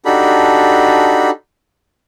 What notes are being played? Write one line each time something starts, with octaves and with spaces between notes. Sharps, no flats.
D4 D#4 F#4 G4 A4 B5